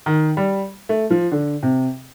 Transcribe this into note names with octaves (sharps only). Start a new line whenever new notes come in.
D#3
G3
A3
F3
D3
C3